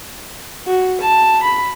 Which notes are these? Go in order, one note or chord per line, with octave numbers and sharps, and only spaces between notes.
F#4
A5
B5